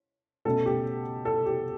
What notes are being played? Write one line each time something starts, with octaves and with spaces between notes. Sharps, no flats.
B2 A3 C#4 A4
G4
A4
G4